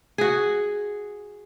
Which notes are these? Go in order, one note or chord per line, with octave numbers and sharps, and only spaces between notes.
F#4 G#4